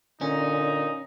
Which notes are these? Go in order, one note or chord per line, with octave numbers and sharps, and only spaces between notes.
A#2 D3 C#4 D#4